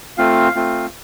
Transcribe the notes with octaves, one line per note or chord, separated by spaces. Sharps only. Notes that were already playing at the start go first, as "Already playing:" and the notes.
A3 C4 F4 F5
A3 C4 F4